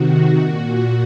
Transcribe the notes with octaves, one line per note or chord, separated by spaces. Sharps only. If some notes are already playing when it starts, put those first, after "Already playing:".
Already playing: C3 D#3 F#4
A#2